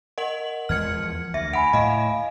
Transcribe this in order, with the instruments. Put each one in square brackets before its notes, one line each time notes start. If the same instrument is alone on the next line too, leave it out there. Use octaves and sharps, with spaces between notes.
[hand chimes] A#4 [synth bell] D#5 F#5 F#7
[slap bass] E2 F3 G#3 [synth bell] F6 G#6 C#7
[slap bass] D2 [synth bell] E5 [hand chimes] A#6
[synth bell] F#5 [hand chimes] G#5 B5 D7
[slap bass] A2 [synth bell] D#5 F5